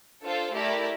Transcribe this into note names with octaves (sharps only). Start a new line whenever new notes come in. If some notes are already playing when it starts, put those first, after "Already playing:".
D4 F4 A4 C5 F5
A3 E4 G4 A#4 D5